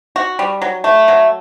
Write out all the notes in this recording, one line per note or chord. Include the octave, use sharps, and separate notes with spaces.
F#4
G3
F#3
A3
F#3